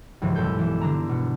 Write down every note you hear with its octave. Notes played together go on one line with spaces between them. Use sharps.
C#2 G2 E3 F3
B1 G2 G#3 A4 G6
E3 E7
D3 D4 A#5
B2 B3